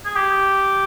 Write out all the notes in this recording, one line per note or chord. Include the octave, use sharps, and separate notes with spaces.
G#4
G4